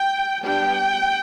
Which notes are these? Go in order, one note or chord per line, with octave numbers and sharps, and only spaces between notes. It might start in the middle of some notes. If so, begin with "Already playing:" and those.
Already playing: G5
G3 B3 D4 G5